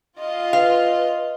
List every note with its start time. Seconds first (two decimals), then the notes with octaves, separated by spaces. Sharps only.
0.20 F4 D#5
0.53 B4 F5